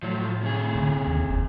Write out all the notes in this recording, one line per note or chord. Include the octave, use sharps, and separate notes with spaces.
A2 F3 F#3
C3 G#4
A#2 D3
D#2 D#3
F#1